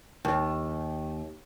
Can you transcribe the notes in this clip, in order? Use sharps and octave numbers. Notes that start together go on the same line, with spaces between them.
D#2